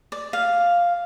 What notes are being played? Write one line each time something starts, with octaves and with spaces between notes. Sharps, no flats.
D5
F5